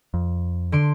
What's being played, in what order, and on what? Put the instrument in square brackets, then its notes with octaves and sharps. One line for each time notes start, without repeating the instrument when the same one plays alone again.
[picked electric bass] F2
[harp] D3 C6 D7